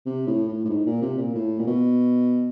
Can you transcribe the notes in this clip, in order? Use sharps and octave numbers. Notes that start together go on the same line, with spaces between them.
C3
A2
A2
A2
G#2
A#2
C3
A#2
A2
A#2
B2